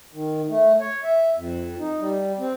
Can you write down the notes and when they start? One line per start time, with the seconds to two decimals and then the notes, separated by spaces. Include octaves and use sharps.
0.14 D#3
0.49 A3
0.80 C#5
1.04 E5
1.36 F2
1.79 D#4
2.00 G3
2.39 C4